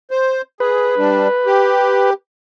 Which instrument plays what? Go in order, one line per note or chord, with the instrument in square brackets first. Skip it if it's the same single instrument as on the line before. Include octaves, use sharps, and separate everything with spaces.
[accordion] C5
[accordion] G#4 [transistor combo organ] B4
[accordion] G3 D4
G4